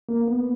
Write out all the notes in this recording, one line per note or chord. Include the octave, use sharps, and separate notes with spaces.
A#3
B3